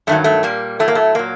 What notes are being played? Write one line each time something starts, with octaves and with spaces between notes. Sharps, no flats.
G2 D#3 F#3 A3
A3
A#2 G3 A#3
A2 F#3 A3
A#3
A3
A#2 F#3 A#3